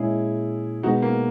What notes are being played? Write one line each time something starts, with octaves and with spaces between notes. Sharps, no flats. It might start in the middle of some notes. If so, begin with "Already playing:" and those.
Already playing: A#2 G#3 C#4 E4 G#4
B2 G#3 B3 D#4 F#4
A#3